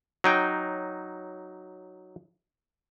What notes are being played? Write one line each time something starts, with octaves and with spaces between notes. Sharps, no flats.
F#3 D#4 G5